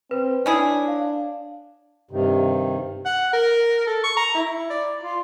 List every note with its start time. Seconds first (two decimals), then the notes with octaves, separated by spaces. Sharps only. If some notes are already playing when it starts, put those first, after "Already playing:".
0.11 C4 B4
0.46 C#4 D4 E4 G#4
0.88 F5
2.11 G2 C3 D#3
3.06 F#5
3.33 A#4
3.87 A4
4.03 C#6
4.17 A#5
4.35 E4
4.70 D5
5.03 F4